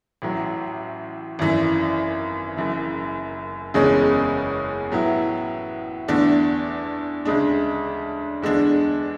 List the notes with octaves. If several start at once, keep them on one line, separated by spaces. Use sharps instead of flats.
A1 A2 F#3
G#1 F#2 E3
F#1 F#2 E3
F#1 E2 C#3 G#3 C#4
A2 F#3 B3 E4
E2 D3 A3 D4
D2 C#3 G#3 D4
E2 D3 G#3 D4